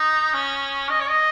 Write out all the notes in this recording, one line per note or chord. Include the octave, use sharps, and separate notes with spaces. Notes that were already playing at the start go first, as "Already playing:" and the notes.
Already playing: D#4
C#4
D#5
C#5
D#5